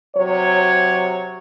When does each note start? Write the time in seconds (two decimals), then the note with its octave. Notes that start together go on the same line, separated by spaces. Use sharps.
0.16 C3 F#3 C#5